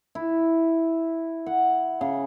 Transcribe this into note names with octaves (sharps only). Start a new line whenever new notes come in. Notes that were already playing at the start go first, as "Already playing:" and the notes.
E4
F#5
C#3